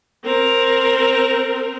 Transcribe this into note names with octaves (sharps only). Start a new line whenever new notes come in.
C4 A#4